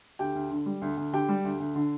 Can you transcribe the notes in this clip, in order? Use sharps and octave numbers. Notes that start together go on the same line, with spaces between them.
D2 G4 G5
D2
D3
G3
D2
D2
D3 G4 G5
G3
D2
D2
D3